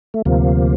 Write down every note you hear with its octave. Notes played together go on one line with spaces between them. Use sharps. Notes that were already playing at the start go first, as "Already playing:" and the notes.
A3
D2 C3 F3 A#3